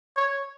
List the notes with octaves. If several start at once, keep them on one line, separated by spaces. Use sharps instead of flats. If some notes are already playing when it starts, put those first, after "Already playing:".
C#5